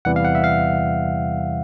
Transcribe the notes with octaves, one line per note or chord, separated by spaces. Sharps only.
E2 C3 E3 G3 F#5
F5
F#5
E5
F5